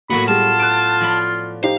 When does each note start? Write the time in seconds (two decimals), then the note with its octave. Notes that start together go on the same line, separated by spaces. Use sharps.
0.10 A2 F#3 A#3 B3 F#4 B5
0.28 G3 F4 G#4 A5
0.59 F#6 D7
1.01 F3 D5 B5
1.64 D#4 G4 C5 F5